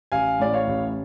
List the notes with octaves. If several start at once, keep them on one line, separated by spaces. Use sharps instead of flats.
A1 F5 G#5
A2 D5
C#5 F5
A1